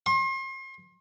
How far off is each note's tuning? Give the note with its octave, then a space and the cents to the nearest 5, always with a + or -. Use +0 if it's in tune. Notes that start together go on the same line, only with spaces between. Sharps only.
C6 +40